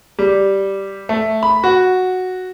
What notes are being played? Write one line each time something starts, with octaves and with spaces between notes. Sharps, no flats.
G3
A3
B5
F#4